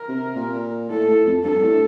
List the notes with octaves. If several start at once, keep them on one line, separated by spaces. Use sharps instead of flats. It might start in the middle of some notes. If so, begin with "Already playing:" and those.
Already playing: A#4
C3
A#2
A2 A4
A2
F2
G2 A4
A2